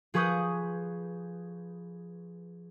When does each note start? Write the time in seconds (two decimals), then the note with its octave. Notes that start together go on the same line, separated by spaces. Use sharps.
0.14 F3 G#4 B4 C#6 D#6 G6